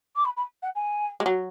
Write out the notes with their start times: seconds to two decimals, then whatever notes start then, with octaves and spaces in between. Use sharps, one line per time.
0.15 D6
0.24 B5
0.36 B5
0.62 F#5
0.75 G#5
1.20 G#3
1.26 F#3